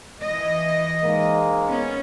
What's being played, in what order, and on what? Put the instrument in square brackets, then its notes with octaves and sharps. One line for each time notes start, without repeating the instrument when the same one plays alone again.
[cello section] E3 D#5
[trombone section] G#2 G#3 A#3
[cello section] B3 C#4